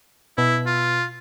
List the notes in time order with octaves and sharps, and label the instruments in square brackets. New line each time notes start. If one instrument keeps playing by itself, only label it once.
[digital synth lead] B2 [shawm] E4
[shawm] F4